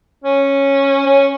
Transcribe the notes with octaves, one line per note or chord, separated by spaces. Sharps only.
C#4
C#4